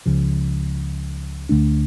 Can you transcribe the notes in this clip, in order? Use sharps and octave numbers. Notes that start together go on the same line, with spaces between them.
C#2 C#3 F3
D2 D3 A3 D4